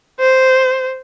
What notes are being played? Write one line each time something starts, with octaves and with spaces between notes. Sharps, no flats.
C5